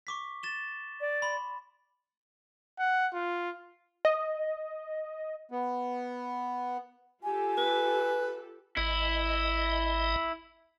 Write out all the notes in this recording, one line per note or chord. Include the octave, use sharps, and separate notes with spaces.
C#6 D6 B6
A6 E7 G7
D5
B5 C6
F#5
F4
D#5
B3
F4 G4 A4 G#5
B4
G#1 E4 D#5